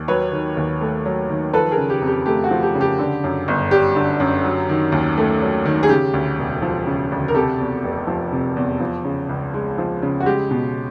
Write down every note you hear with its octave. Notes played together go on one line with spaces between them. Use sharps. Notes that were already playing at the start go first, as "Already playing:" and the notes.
Already playing: D#2
F#3 B4 C#5
D#3
D#2
A3
F#3
D#3
F3 A4 B4
G#4 A#4
C#3
G4
F2
G4
A3 G4
F#4
F3
G4
C#3
G4
D3
F#2
G1
G3 G4
D3
F#2
F#3
D#3
D#2
A3
F#3
D#3
G#4
C#3 G4
D2
E1
F3
C#3
D2
A#4
C3 G4 A4
E2
F1
F3
C3
E2
F3
C#3
C#2
G#3
F3
C#3
F#4
G#3 G4
B2